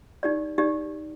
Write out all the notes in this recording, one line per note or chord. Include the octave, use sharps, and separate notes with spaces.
D#4 G4 D5
D#4 G4 D5